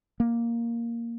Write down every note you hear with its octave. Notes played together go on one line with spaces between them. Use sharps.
A#3